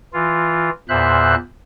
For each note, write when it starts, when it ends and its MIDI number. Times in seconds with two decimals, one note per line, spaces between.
0.13 0.70 52
0.13 0.70 65
0.89 1.35 40
0.89 1.35 46
0.89 1.35 72
0.89 1.35 76
0.89 1.35 90